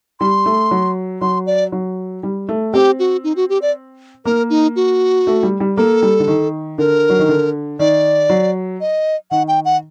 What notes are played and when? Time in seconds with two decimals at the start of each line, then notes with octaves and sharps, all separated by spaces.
0.20 G3 C6
0.46 A3
0.71 F#3
1.21 F#3 C6
1.47 D5
1.72 F#3
2.23 G3
2.49 A3
2.73 C4 G4
2.99 F#4
3.24 D#4
3.36 F#4
3.49 G4
3.62 D5
4.25 A#3 A#4
4.50 D#4
4.76 F#4
5.27 A3
5.43 G3
5.60 G3
5.77 A#3 A4
6.02 G3
6.20 D3
6.28 D#3
6.78 D3 A#4
7.10 F#3
7.19 D#3
7.29 D3
7.79 D#3 D5
8.30 F#3
8.81 D#5
9.31 D#3 F#5
9.48 G5
9.65 F#5